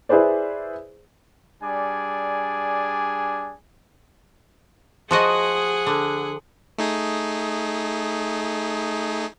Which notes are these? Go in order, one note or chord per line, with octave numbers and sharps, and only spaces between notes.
E4 G#4 B4 C5 D5
G3 D4 G#4 D5 G#5
F3 F#4 G#4 D#5 F#5
D3
A3 D#4 G#4